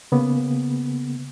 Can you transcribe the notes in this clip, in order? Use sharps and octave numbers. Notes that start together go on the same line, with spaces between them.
C#3 A#3 B3